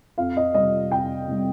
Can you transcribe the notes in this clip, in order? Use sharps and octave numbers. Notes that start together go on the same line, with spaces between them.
F2 F5
D#5
C3 G3 D#5
F2 G5
C3 G3